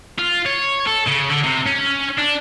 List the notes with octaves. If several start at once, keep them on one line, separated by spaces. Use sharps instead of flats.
F4
C#5
A4
C#3
D3
C3
C#4
D4